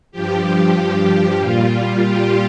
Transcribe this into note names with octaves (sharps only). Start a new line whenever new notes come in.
G2 F3 G4
A#2 G3 F4
G4